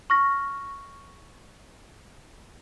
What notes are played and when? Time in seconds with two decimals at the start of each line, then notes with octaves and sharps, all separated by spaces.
0.10 C#6 F6 A#6